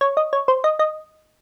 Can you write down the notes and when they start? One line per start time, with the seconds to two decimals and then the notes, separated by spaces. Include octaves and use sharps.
0.01 C#5
0.17 D#5
0.33 C#5
0.48 C5
0.64 D#5
0.79 D#5